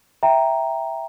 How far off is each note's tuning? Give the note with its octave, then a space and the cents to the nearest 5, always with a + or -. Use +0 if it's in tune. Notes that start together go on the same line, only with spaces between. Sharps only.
E5 +0 G5 +0 A#5 +0